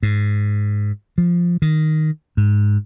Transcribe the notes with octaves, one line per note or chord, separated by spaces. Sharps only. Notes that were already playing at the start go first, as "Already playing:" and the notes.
G#2
F3
D#3
G#2